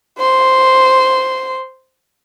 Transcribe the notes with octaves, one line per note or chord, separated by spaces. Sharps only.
C5 C6